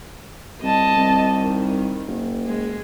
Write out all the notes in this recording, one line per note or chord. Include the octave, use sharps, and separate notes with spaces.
C2 D#5 A5
C2
D#3
F#1
G#3